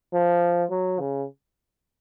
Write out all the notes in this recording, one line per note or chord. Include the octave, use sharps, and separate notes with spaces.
F3
F#3
C#3